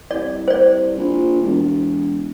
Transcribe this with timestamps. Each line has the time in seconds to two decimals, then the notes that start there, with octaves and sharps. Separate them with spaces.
0.11 C2 D5
0.48 C5 D5
0.98 A#1
1.41 E1